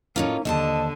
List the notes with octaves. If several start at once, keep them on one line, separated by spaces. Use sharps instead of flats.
A2 A#3 C#4 D#4 F4
D#2 D3 C5 D#5 A5